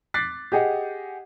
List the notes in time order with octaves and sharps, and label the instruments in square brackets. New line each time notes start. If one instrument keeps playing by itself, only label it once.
[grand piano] D6 F#6 A6 B6 C7
G4 G#4 D#5 F#5